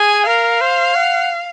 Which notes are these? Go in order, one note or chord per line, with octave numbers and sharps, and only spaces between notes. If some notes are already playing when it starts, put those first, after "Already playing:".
Already playing: G#4 G#5
A#4 F5
C5
F#5